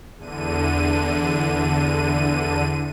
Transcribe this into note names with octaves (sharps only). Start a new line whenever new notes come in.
E2 D3 D#7